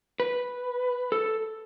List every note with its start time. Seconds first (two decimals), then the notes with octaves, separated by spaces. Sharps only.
0.20 B4
1.12 A4